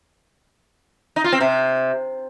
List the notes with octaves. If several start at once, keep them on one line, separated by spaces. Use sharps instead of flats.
D#4
F4
C4
C3